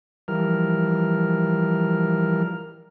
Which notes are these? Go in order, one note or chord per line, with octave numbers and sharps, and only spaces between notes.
E3 F3 G3 A#4 F6